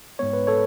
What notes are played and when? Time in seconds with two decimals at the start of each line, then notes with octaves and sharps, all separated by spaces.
0.19 G#2 G#3 B3 C#5
0.33 B4
0.47 A4 C#5